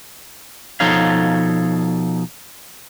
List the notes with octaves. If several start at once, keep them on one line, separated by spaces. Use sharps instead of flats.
B2 F3 D#4 A4 C#5 F5